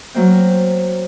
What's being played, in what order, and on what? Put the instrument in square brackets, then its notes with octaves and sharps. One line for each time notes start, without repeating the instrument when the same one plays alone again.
[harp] F#3 A#3 C4